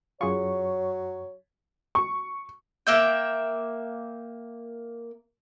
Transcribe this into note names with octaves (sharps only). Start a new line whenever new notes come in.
F#2 F#3 F4 G#4 C#5 C#6
C#6
A#3 E5 G5